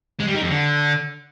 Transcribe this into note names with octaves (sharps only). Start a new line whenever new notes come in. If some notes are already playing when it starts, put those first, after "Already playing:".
G#3
G3
D#3
F2
D3